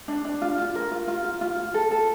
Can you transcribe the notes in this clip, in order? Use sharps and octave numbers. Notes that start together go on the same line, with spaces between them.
D4
D4
F4
F4
A#4
F4
F4
F4
F4
F4
A4
A4